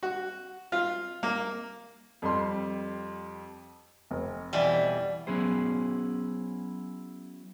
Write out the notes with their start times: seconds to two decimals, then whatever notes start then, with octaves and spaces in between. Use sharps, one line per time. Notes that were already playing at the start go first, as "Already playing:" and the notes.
0.03 F#4
0.72 F4
1.23 A#3
2.22 F2 G3 C6
4.11 F1
4.53 B2 E3 G3
5.27 F#3 B3 C#4 E4 G#4 C5